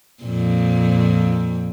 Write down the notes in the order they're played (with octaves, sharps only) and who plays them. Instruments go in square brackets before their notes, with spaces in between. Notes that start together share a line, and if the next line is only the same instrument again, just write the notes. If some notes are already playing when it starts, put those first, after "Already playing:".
[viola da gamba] F2 A#2